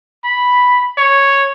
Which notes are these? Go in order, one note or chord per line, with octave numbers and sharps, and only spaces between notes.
B5
C#5